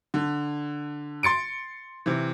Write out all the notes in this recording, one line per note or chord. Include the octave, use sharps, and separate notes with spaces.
D3
C6 A6 C#7 D7
C3 E3